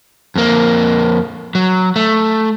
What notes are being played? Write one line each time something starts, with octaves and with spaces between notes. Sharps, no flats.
F2 A#3
F#3
A3